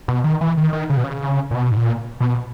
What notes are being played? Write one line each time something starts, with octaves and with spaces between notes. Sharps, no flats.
B2
D#3
E3
D#3
D#3
C#3
B2
C#3
A#2
B2
G#2
A#2
B2